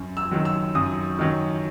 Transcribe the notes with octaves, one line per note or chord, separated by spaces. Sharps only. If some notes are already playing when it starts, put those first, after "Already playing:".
Already playing: F#2
E6
D#3 F#3
E6
F#2 D#6
D#3 F#3